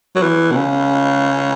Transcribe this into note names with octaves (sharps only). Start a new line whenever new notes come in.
F#3
E3
B2
C#3